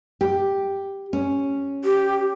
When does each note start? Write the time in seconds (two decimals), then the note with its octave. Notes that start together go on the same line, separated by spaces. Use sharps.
0.21 G4
1.13 C#4
1.85 G4